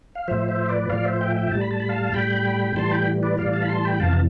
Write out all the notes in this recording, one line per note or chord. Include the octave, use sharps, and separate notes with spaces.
F5
A2 F3 C5 E5
C5 E5
B4 D5
A2 F3 D5 F5
C5 E5
E5 G5
E5 G5
A2 G3 A5
B5
A5
B5
F5 A5
A2 G3 G5 B5
A2 E3 G3 A5 C6
G5 B5
B4 D5
A2 E3 G3 D5 F5
F5 A5
B5
A5 C6
G5 B5
F2 C3 E3 F5 A5